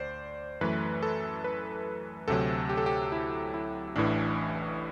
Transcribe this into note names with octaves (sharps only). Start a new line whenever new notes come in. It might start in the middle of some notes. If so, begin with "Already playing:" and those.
Already playing: D2 C5 D5
F#2 E3 A3 B4
A4
B4
D2 C3 F#3 A4
G4
A4
G4
E4
E4
A1 A2 E3 D4